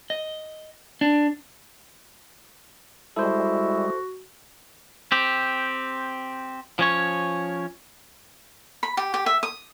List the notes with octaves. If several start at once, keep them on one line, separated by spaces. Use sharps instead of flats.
D#5
D4
G3 G#3 E4 F#4 A4 C5
C4 G4
F3 C#4 C#5
B5
G4
G4
E5
D#6